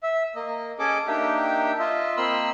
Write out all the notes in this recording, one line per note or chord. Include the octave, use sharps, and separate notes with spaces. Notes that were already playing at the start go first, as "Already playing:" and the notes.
E5
A#3 D#5
C#4 G#4 A4 D#5 D6
A#3 D4 D#4 G4 E5 G5
F4 D#5 E5
A#3 C4 D#5 B5 C6 E6